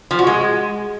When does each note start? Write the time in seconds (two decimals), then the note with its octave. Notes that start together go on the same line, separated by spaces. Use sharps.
0.11 F3
0.19 F#4
0.27 G#3